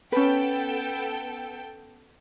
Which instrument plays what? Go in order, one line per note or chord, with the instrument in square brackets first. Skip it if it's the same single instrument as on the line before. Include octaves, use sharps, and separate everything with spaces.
[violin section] B3 A4 G5 [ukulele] C#4 B4